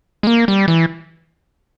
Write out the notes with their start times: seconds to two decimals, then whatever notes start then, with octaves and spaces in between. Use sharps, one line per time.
0.23 G#3
0.27 A#3
0.48 G3
0.68 E3